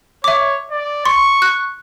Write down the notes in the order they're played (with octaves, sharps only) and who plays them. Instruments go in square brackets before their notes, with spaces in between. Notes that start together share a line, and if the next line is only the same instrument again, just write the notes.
[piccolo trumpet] C#5 [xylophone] E5 D6
[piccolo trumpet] D5
[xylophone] C6 [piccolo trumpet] C#6
[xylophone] F#6